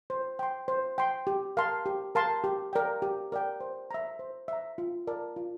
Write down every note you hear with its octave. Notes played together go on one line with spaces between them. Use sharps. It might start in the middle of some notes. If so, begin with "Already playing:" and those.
C5
G5 C6
C5
G5 C6
G4
A#4 F5 A5 C6
G4
A#4 F5 A5 C6
G4
A#4 D5 G5
G4
A#4 D5 G5
C5
E5 A#5
C5
E5 A#5
F4
A#4 D5 A5
F4